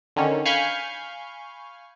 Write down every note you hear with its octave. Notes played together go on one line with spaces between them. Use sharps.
D3 D#3 C#4
F5 G#5 B5 C#6 F6 G6